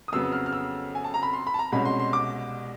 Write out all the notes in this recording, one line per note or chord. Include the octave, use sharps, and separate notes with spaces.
D#6
F2 C#3 F#3 B3 E6
F6
F6
E6
G#5
A5
A#5
B5
C6
B5
A5
A#5
C2 B2 G#3 C#4 B5
C6
C6
D6